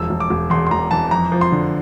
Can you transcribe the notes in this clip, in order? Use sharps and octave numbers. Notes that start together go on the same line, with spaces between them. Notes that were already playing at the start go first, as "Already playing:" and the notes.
Already playing: E1 F3 E6
E1
D6
E1
E2 C6
C6
E1 A#5
E3 A5
F2 A#5
F3
C6
D3